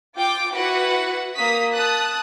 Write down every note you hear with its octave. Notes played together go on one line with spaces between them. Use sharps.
F4 G5 D6
E4 F#4 B4 F#5
A#3 D#6 B6
A5 D#6 F#6